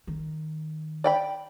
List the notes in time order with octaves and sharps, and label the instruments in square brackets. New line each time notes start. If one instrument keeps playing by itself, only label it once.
[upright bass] D#3
[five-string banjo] D5 G5 B5